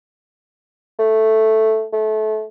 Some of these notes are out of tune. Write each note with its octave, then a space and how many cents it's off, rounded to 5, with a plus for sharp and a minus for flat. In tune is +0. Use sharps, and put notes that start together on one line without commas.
A3 +0
A3 -25